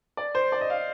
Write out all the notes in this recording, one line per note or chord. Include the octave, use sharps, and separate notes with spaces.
D5
C5
D5
D#5
F5